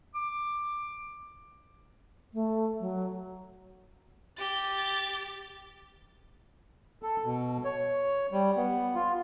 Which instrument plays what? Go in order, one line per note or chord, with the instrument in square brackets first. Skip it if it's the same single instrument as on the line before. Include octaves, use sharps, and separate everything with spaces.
[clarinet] D6
[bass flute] A3
F#3
[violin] G4 A6
[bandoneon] A4
B2
C#5
G3
B3
F4